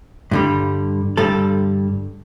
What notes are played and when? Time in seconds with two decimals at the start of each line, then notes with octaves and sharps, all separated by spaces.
0.31 G2 D3 G3
1.17 G2 D3 G3 A4